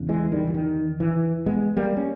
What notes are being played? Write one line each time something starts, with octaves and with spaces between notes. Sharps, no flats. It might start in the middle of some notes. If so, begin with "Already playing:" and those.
Already playing: E2 C#3
E3 G#3
D#3 G3
E3
D#3
E3
G#3 B3
G3 A#3
C#4